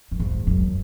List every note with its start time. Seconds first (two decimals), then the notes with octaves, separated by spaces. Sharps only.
0.11 F#2
0.20 G#2
0.47 F#2